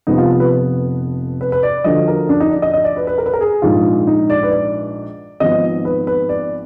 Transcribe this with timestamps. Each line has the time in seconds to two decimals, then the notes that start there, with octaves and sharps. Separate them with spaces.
0.07 F1 F2 F3 B3 D#4
0.18 F4
0.40 B4
0.51 B4
1.41 B4
1.52 B4
1.63 D5
1.84 D2 D3 F3 D#5
2.08 A#4
2.29 D4
2.40 D#4
2.51 D5
2.62 D#5
2.74 D#5
2.84 D5
2.96 B4
3.07 B4
3.18 A#4
3.26 B4
3.33 A#4
3.41 G#4
3.62 A#1 G#2 D#3 F4
4.07 D#4
4.30 D5
4.43 B4
4.51 D5
5.40 G#1 G#2 F3 B3 D#5
5.85 B4
6.07 B4
6.29 D5